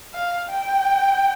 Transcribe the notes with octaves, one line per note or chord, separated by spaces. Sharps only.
F5
G5